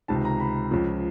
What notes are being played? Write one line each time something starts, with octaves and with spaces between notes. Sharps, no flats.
C#2 C3 D#3 A5
A#5
B5
C#2 C#3 F3